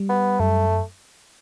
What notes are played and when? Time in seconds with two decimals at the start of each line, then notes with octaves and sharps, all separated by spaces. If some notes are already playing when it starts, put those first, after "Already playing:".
Already playing: G3
0.09 B3
0.39 F#2 A3